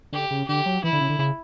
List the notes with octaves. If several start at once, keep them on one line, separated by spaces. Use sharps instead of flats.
D3 G4
C#3
D3 G4
F#3
E3 E4
D3
C#3
D3
C#3